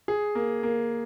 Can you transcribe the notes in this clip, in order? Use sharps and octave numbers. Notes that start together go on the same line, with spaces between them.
G#4
A#3
A#3